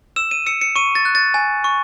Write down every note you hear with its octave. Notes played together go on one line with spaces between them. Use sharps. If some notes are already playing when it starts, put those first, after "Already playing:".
E6 E7
D#7
E6 C#7
C#7
C#6 D#7
A6
F#6
A6
G#5
C#6